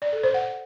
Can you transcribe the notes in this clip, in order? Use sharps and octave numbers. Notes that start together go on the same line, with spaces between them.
D5
A4
C5
F#5